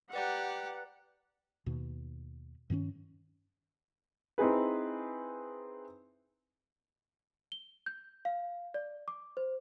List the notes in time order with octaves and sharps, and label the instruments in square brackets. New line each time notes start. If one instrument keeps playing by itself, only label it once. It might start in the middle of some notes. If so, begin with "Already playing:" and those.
[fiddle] G4 [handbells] B4 D5 A#5 [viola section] F#5
[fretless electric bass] D#2 B2
G2 D#3 B3 C#4
[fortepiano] C4 D#4 E4 G#4 B4
[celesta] G7
G6
F5
D5
D6
C5